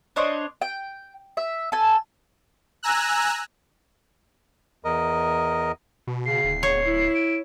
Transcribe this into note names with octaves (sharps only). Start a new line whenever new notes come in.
D4 C5 C#5 D#5
G5
E5
A4 G#5
G#5 A#5 E6 F#6
E2 A#4 D#5
B2
C#3 C7
D1
E2 C#5
E4
D7